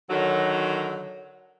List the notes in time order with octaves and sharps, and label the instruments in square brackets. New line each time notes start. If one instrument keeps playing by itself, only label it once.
[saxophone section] D3 D#3 F#3